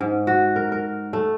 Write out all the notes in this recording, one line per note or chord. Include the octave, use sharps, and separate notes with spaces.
G#2
F#4
A#4
A#4
A3